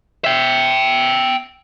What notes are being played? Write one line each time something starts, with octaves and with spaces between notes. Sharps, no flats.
E5 G5